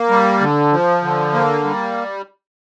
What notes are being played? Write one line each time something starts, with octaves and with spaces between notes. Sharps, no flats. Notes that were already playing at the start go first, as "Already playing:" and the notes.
Already playing: A#3
G3
D3
F3
D3
A#3
G3